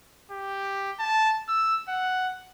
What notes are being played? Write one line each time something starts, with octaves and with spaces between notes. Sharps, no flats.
G4
A5
E6
F#5